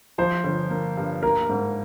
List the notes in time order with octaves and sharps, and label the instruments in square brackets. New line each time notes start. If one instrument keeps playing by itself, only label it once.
[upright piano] F3 [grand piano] C5
[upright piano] G1
A#3
G2
[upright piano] A#3 [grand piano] A#4
[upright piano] G#2